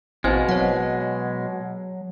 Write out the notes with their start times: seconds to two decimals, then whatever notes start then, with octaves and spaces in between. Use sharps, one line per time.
0.24 A1 B2 G#3 C4 E4 C5
0.49 F#3 C#5 F#5